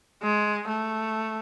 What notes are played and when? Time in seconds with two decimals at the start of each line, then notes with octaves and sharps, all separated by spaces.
0.22 G#3
0.67 A3